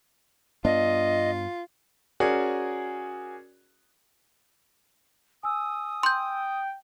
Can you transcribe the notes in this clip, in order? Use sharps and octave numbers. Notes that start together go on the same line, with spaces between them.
G2 B3 D4 F4 D#5
C#4 F#4 G#4 A#4 D5
G#5 D#6 E6
G5 C6 G6